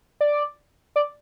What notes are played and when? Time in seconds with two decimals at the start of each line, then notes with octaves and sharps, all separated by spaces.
0.21 D5
0.96 D5